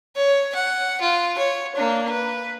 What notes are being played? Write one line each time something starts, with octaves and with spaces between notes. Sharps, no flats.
C#5
F#5
F4
C#5
A#3 D4
B4